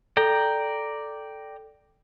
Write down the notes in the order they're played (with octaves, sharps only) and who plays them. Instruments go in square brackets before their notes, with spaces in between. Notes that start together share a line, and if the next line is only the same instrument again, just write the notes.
[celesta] A4 [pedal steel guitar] D5 G5 A#5